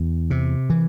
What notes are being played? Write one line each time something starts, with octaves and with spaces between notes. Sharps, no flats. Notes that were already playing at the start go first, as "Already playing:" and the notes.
Already playing: E2
C3
E3